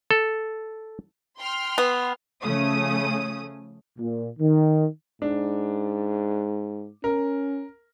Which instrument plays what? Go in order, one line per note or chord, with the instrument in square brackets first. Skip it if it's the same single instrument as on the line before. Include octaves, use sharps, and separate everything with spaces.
[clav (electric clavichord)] A4
[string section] G5 C6 F6
[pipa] B3
[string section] C#3 F3 A3 C#4 D#6
[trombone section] A#2
D#3
[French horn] G#2 [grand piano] D4
[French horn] C#4 [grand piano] A#4